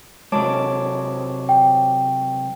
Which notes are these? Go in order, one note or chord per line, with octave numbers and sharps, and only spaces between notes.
C3 F#3 G#3 C#5 A5 D6
G5